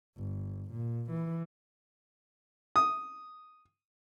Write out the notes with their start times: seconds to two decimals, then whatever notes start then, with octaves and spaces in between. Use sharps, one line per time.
0.17 G1
0.71 A#2
1.11 E3
2.76 D#6